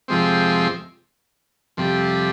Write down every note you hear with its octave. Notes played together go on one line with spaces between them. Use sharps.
F2 C3 F3 G#3 C4
F2 C3 G3